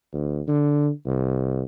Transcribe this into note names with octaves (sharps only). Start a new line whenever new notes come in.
D2
D3
C2